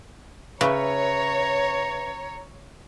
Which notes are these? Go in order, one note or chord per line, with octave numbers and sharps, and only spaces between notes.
C#3 B4 C#5 E5 A#5